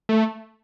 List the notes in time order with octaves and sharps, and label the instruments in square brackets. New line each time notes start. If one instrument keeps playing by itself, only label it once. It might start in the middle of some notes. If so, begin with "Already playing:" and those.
[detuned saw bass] A3